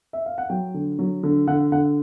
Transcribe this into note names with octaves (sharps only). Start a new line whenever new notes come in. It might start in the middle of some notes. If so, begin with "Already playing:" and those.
E5
F5
F#5
F#3 G5
D3
F#3
D3
D3 F#5
D3 F#5